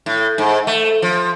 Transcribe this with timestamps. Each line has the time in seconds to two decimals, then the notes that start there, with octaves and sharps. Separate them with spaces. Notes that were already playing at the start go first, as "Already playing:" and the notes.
0.06 A2
0.38 G#2
0.67 A3
1.02 F3